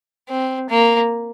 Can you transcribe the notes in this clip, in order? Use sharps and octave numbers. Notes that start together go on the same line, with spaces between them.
C4
A#3